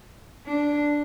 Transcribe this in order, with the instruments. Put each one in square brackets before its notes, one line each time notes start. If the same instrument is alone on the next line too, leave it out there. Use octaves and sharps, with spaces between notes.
[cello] D4